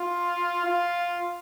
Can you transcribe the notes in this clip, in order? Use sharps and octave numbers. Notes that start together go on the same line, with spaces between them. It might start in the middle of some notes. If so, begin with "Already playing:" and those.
Already playing: F4
F4